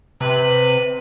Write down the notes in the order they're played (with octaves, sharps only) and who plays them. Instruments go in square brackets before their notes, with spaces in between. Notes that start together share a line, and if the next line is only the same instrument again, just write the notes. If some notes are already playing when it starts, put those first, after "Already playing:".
[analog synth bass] C3 [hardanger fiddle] B4